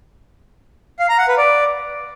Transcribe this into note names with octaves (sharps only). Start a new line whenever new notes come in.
F5
A#5
F#5
B4
D5